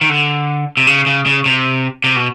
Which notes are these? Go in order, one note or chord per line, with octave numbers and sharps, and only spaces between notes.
D#3
D3
C3
C#3
C#3
C#3
C3
C3
B2